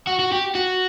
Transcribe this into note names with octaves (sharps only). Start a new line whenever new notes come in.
F#4
F#4
G4
F#4